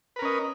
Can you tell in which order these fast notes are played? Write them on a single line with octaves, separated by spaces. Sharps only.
B4 A#4 C#4 D#5